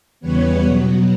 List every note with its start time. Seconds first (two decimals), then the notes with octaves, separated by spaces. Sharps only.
0.20 E2 C#3 E3 G3 B3 B4 C#5
0.63 B2 F#3 B3